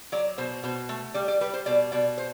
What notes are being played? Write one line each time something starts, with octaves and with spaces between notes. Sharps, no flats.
F#3 D5
B2 C5
B2 C5
A3
G3 D5
D5
G3 B4
C5
B2 D5
B2 D5
C5